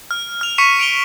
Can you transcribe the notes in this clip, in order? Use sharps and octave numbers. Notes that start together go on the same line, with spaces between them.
F6
F6 F7
C#6 B6 C#7 D#7 E7
D7 F7 G7